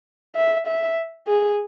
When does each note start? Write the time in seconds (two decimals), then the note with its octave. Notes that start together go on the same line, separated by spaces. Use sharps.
0.36 E5
0.67 E5
1.28 G#4